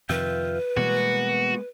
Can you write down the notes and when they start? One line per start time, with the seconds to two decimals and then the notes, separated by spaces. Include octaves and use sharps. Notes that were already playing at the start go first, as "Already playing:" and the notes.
0.09 F2 C3 D#3 F4 B4 E5 G5
0.77 B2 E3 G3 G#3 A#3 B3 F#4